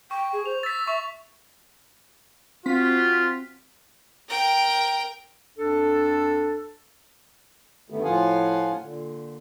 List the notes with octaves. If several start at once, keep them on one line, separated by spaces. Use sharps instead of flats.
G5 C#6
G#4
C5 F7
E6 A6 B6
E5 C#6 B6 F7
C4 F4 F#4 B6
A#4 G5
F2 D4 A4
G2 D3 D#3 A3 B3
A2 F3 F4 F5 F#5 G#5
A#2 D3